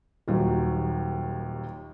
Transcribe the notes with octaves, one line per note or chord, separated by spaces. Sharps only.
D#1 D#2 F#3